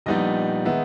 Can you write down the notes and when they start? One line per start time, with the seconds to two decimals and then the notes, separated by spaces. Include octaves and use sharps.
0.06 A#1 A#2 G3 B3 D#4 D#5
0.65 D#3 G#3 B3 D#4 E5